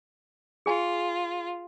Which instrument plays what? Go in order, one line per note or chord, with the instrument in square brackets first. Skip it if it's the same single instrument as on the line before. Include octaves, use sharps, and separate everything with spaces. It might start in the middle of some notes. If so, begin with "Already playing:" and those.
[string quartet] F4 [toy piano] G#4 G#5